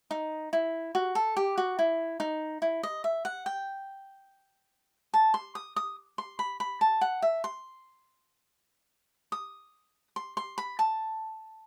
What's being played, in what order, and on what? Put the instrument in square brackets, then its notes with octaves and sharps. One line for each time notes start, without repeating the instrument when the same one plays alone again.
[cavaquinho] D#4
E4
F#4
A4
G4
F#4
E4
D#4
E4
D#5
E5
F#5
G5
A5
C6
D#6
D#6
C6
B5
B5
A5
F#5
E5
C6
D#6
C6
C6
B5
A5